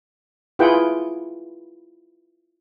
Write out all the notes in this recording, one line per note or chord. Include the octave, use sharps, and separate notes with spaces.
E4 F4 G#4 B4 F#5 G5